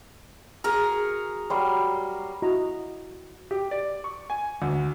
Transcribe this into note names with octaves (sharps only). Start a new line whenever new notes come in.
F#4 G#4 A#4
F#3 G3 C6
E4 F#4 D#5 A#5
G4
D5
C#6
G#5
D2